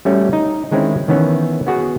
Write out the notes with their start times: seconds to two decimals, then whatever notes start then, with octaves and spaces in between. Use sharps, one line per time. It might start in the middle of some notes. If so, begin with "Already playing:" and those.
0.05 G3 A3 C#4 F#4
0.33 D#4
0.71 D#3 G#3 C4 C#4 E4
1.08 D#3 E3 B3 C#4
1.67 B3 F#4 G#4